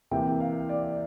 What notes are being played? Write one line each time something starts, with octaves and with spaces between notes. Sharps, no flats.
C3 E3 A#3 G5
F5
D5